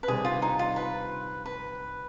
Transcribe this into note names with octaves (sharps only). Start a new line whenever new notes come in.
B4
C3 D#3 G3 D4 G#4
F4
D#4
F4
B4
B4